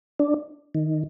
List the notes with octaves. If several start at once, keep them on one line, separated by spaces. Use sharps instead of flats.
D4
D#3